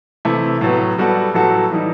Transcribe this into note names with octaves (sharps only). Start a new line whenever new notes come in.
C3 E3 A3 E4
A2 F#3 B3
G3 B3 F#4 A4
A2 F#3 B3 F#4 A4
E3 G3 D#4